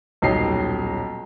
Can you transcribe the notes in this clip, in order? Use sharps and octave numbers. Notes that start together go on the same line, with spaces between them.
D#1 B1 D#4 G4 C7